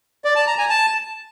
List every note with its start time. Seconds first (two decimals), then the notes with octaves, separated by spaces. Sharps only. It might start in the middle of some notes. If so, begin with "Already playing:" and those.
0.25 D5
0.36 A5
0.47 A#5
0.58 G#5
0.70 A5